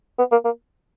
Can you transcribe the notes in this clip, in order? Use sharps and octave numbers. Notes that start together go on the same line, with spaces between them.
B3
A#3
A#3